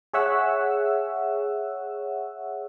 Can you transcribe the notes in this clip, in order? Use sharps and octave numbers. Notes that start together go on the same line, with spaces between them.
G#4 C#5 E5 F#5 E6